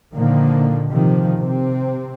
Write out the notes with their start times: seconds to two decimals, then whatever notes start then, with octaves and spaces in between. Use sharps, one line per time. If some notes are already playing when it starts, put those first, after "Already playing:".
0.15 A#2 D3 D#3 F3 A#3
0.91 C3 D#3 F3
1.38 C3 C4